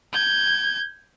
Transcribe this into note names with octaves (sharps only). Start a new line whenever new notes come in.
G6 G#6